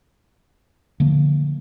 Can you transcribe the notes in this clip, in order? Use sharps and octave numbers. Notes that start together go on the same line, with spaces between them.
D3 F3 A3 A#3